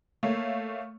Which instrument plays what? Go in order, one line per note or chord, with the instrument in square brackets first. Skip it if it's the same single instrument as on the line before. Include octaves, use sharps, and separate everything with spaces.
[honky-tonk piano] A3 A#3 C#5 F5